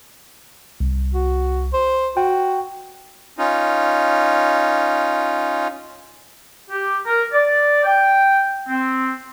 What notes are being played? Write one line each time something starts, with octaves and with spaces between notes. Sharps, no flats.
C2
F#4
C5
F#4 G5
C#4 D#4 F4
G4
A#4
D5
G5
C4